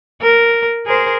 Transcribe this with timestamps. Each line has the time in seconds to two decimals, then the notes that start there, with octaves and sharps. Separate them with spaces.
0.22 A#4
0.86 G#4 A#4 C5